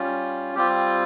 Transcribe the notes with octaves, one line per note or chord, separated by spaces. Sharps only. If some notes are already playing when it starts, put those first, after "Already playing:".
Already playing: G3 C#4 F4
G3 C4 F4 G4